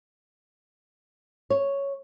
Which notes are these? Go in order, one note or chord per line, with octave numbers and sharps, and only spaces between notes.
C#5